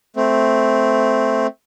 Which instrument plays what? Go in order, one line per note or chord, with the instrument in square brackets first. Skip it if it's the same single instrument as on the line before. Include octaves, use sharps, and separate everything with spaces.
[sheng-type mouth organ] A3 C4